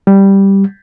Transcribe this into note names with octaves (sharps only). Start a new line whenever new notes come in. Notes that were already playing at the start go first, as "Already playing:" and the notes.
G3